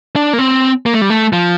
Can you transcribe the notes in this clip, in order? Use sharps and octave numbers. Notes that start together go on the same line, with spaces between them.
D4
A#3
C4
A#3
A3
G3
A3
F3